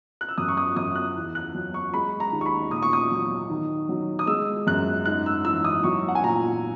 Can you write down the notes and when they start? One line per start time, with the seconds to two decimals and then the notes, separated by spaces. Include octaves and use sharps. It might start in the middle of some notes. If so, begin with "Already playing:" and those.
0.21 F#6
0.29 E6
0.38 F#2 D#6
0.48 C#6
0.57 D#6
0.76 F#2 D#6
0.95 F#6
1.16 E2
1.35 F#6
1.54 F#3
1.74 C#6
1.94 G#3 B5
2.20 A#5
2.33 D#2
2.41 C#6
2.46 B5
2.71 A#2 D#6
2.83 C#6
2.93 D#6
3.11 F#3
3.50 D#3
3.89 F#3
4.19 D#6
4.27 G#3 E6
4.67 F#2 F#6
5.05 G#2 F#6
5.26 E6
5.45 E3 E6
5.64 D#6
5.84 F#3 C#6
6.08 F#5
6.15 G#5
6.24 A#2 A#5